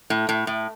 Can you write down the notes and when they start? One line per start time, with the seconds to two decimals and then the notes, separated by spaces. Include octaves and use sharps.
0.10 A2
0.29 A2
0.47 A2